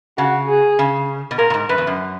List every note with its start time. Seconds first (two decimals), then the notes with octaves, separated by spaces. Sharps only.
0.18 C#3 F#4
0.48 G#4
0.79 C#3
1.31 B2
1.38 A#2 A#4
1.50 A#2
1.54 G#2
1.69 F#2 B4
1.78 E2
1.87 F#2